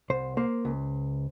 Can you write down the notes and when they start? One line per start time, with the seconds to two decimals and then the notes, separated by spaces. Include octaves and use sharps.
0.10 C2 C5
0.37 A#3 C5
0.65 C#2